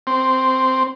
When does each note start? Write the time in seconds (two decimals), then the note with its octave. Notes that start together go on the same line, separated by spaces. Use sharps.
0.07 C4